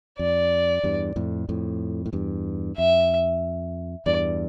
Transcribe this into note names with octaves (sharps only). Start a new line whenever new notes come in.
F2 D5
E2 G2
F2 A2
F2 A2
A2
E2 G2
F2 E5
E2 G2 D5